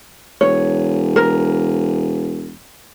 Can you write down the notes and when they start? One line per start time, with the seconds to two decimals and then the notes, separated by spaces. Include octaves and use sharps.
0.41 E1 C#5
1.16 A#4